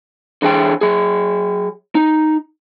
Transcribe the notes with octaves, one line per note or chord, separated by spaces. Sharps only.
D3 E3 G#4 G5
F#3 G#4
D#4